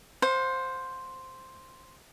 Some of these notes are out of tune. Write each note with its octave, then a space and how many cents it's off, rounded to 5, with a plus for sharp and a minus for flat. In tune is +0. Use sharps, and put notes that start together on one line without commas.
C5 +0 F5 +45